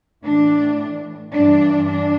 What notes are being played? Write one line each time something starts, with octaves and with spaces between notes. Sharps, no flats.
A2 E3 D4
G2 E3 D4
D4